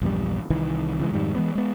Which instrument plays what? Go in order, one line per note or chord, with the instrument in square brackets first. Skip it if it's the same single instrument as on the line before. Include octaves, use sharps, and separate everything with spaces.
[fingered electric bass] A#1 E2 G2 G3
C2 D#3 E3
C#3 E3 G#3
F2 G#2 D#3 G3
E3 G#3 B3
G#3 B3